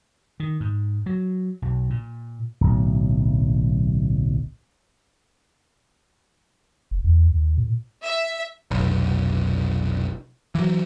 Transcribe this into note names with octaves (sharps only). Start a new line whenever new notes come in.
D#3
G#2
F#3
B1
A#2
D1 B1
F1
E2
D#2
A#2
E5
F1 B1
E3 F#3